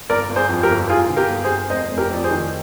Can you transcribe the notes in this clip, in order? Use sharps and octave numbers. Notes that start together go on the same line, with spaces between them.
G1 A#4 D5
G1
G#4 C5
F2
G4 A#4
G1
G1 F4 G#4
D3
G4 A#4
G1
G#4 C5
G1
F1 C5 D#5
F1
G4 A#4
F2 D5
G#4 C5
D#3